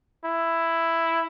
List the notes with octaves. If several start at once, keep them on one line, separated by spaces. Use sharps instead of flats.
E4